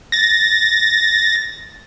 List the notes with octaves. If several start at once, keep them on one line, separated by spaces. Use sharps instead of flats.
A6 A#6